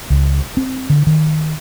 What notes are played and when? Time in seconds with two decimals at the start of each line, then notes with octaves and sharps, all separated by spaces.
0.10 C#2
0.57 C4
0.90 D3
1.07 D#3